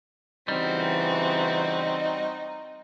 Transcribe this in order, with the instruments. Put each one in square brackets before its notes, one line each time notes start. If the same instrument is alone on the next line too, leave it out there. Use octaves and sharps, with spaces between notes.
[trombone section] C#3 E3 [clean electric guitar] G3 [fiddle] C4 F#4 [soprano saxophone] D#4